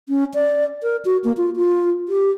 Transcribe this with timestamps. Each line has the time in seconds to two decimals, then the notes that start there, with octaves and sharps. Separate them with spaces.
0.09 C#4
0.34 D5
0.83 A#4
1.05 F#4
1.24 A#3
1.37 F4
1.56 F4
2.09 G4